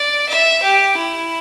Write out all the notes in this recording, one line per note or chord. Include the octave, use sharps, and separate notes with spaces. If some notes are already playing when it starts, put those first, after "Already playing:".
Already playing: D5
E5
G4
E4